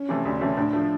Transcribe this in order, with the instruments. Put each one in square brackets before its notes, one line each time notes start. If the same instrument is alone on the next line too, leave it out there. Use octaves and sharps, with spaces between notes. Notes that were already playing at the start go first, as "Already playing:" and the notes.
Already playing: [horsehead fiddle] C#4
[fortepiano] C3 E3 A3
D2
C3 E3 A3
[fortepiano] A2 [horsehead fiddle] D4
[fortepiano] F3 A3